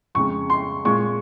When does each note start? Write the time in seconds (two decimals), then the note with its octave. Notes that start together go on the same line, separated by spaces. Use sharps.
0.15 F2 C#3 G#3 C#6
0.50 C6
0.85 A#2 G#3 C#6